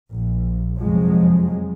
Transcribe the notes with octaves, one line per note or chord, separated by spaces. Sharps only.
A#1
F2 C3 F3 F#3 G#3